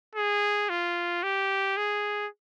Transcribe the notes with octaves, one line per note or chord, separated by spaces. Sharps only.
G#4
F4
G4
G#4